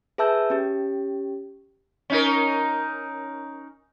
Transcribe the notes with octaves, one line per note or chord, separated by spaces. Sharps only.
G#4 B4 E5 A5 E6 G6
C#4 G4
C#4 D#4 A#4